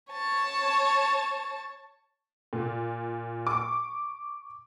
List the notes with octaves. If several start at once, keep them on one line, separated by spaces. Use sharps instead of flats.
C#5 A5
A#2
C#6 D6